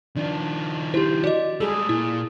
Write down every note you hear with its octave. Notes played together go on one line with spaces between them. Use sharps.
D#3 F3 D4
E4 G4 C5
F#4 D5 D#5
G3 G#3 G#4 A4 E6
A#2 E4